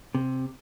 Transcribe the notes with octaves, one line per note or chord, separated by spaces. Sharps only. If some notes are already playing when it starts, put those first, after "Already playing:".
C3